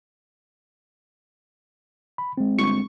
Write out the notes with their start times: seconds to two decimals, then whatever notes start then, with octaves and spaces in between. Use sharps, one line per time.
2.18 B5
2.38 G#3 C4
2.58 G1 C#6